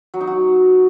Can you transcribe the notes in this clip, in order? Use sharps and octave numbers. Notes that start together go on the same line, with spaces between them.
F#3
D#4
F#4